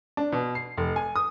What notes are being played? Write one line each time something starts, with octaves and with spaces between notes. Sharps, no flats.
D4
B2
C7
F1
G#5
D#6